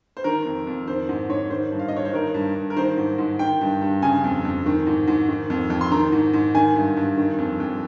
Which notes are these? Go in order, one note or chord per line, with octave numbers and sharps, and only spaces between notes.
C5
D#3 A#4
F2
F2
D#3 C5
G#2
G#2 C#5
D#3 C5
G2
F5
D#5
G2 C#5
C5
D#3 A#4
G2
G2
A#4
D#3 C5
G#2
G#2
D#3 G5
G2
G2
C#3 G#5
F2
F2
D#3
G#2
G#2
D#3
F2
F2
C6
D#3 A#5
G#2
G#2
D#3 G#5
G2
G2
D#3
F2
F2